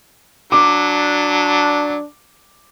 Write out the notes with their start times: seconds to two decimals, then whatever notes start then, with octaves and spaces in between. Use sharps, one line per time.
0.52 F#3 D4 D6